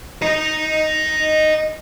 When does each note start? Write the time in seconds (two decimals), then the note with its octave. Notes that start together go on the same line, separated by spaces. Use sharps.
0.22 D#5 A#5